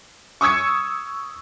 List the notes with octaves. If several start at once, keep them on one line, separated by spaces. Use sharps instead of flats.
C#6 D#6 E6 G#6 C#7